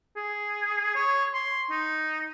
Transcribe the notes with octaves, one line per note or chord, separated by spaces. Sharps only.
G#4
C#5
C6
D#4